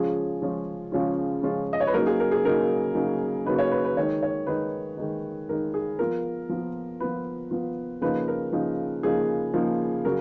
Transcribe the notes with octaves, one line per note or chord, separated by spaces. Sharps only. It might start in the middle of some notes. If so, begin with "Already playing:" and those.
Already playing: C#3 F3 G#3 C#4 F4 G#4
C#3 F3 G#3 C#4 F4
C#3 F3 G#3 C#4 F4
C#3 F3 G#3 C#4 F4
D#5
C#5
B4
C#3 F#3 A#3 D#4 A#4
G#4
A#4
G#4
C#3 F#3 A#3 D#4 A#4
C#3 F#3 A#3 D#4
C#3 F#3 A#3 D#4 B4
C#5
B4
B4
D#3 G#3 D#4 C#5
C#5
D#3 G#3 D#4 B4
D#3 G#3 D#4
D#3 G#3 D#4 A#4
G#4
F3 B3 F4 A#4
F3 B3 F4
F3 B3 F4 B4
F3 B3 F4
C#3 F3 A#3 D#4 B4
A#4
C#3 F3 A#3 D#4
C#3 F3 A#3 D#4 G#4
C#3 F3 A#3 D#4
C#3 F#3 A#4